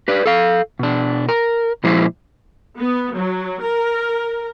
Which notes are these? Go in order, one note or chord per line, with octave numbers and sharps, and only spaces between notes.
G4 B4 D5
A4 F5
B2 D4
A#4
A#2 F3 G#3 E4 C5
B3
F#3
A#4